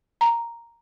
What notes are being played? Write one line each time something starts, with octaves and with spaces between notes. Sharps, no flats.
A#5